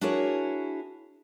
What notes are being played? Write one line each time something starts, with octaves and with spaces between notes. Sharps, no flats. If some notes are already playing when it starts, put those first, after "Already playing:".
D4 E4 F#4 G#4 A#4 C#5